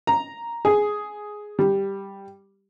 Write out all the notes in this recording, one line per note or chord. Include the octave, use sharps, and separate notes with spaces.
A#5
G#4
G3